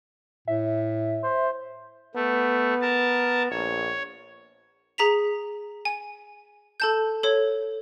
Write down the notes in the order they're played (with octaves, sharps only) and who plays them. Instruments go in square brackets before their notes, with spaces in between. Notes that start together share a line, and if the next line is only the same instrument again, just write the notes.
[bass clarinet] A2 [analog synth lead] E5
[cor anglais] C5
[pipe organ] A3 [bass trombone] B3
[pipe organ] A#4 A5
[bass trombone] A#1 [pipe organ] C#5
[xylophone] G#4 A#5 B6 F7
G#5
A4 A5 G6
A4 C#5